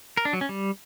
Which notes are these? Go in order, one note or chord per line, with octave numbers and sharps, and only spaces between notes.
A#4
D4
F#3
C#4
G3